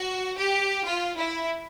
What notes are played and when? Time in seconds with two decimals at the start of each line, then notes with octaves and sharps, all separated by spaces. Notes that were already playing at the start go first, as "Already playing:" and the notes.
Already playing: F#4
0.38 G4
0.85 F4
1.17 E4